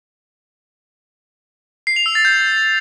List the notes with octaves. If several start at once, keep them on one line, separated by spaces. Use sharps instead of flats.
C7
F7
E6
A6
G6